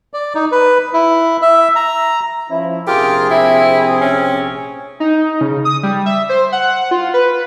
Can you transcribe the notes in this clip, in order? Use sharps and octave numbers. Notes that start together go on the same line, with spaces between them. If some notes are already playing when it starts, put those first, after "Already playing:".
D5
D#4
B4
E4
E5
A#5
F3 C#4 E4
A#1 C3 F4 G4 G#4 A#4
C4 E4
C#4
D#4
C#3
D#6
G3
E5
C5
F#5
F4
B4